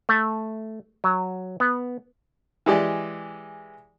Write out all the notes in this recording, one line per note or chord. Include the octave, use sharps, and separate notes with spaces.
A3
F#3
B3
E3 G#3 G4 D5